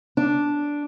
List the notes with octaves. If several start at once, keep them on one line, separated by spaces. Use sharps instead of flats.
D4